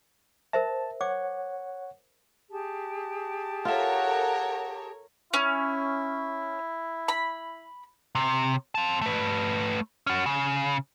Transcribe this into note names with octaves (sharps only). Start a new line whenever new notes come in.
A#4 C5 E5 A5
C#5 F#5 D6
G4 G#4 A5
F4 A4 A#4 C#5 E5 F#5
C#4 E4
B5
C3
C4 A5
A3 B4
C#4 F#4
C#3